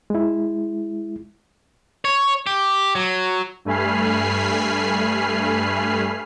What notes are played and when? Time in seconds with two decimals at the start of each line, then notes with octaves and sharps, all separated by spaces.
0.10 G#3 E4
2.05 C#5
2.47 G4
2.95 F#3
3.65 G2 A3 G#5 B5 F6 C7